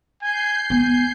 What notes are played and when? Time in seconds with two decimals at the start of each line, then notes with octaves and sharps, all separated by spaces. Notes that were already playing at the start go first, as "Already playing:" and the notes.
0.22 G#5 G6 C7
0.70 B3 G#5